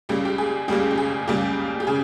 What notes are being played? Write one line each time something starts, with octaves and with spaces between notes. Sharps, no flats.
C#2 C#3 G3 A#3 G4
G4
G#4
C#2 C#3 G3 A#3 G4
G4
G#4
C#2 C#3 G3 A#3 G4
G4
C#3 G#4